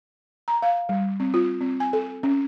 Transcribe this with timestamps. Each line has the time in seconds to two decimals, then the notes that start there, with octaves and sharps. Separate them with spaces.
0.48 A#5
0.62 F5
0.89 G3
1.20 C4
1.34 F4
1.61 C4
1.80 G#5
1.93 A4
2.23 C#4